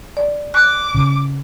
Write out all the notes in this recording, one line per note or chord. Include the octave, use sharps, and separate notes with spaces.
D5
D6 F#6
C#3